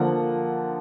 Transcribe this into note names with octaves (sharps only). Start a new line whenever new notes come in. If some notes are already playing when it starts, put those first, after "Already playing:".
Already playing: D3 F3 A#3 F#5